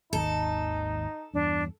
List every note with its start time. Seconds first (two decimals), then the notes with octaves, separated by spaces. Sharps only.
0.13 G#1 D#2 D#4 A4
1.34 E2 G2 D4